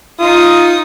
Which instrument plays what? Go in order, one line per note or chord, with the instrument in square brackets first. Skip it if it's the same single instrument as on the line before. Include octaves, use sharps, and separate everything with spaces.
[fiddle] D#4 D#6 [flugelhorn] F4